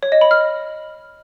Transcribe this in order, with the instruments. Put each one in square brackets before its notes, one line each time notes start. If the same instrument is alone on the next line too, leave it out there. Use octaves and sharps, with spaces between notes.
[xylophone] C#5
D#5
B5
F6